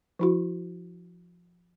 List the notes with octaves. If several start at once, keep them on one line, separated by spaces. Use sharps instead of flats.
F3 E4 F#4